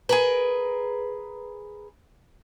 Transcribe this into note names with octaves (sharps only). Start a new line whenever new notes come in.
G#4 A#4 B4